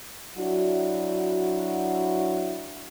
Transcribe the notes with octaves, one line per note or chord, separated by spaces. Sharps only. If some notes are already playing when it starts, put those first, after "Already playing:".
F#3 D4 E4 F#4